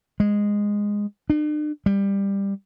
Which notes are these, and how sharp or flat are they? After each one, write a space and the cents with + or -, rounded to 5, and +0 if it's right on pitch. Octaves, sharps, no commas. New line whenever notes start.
G#3 -10
D4 +45
G3 +15